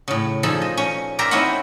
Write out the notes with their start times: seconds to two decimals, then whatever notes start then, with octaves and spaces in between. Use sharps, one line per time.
0.08 A2 C#3
0.43 A#2 F3 D#4 G#4 A4 A5
0.62 D#5
0.77 C#4
1.19 A#4 C5 D5 E5 G5 A#5
1.31 C4 C#4 D#4 E4 F#4 F#5